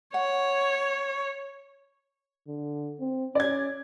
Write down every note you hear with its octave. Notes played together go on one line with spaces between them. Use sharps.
C#5 F#5
D3
C4
C#4 D5 G#6